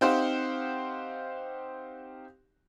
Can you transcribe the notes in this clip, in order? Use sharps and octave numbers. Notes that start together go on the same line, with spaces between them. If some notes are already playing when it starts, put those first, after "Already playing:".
C4 D#4 G4 C5 F5 F#5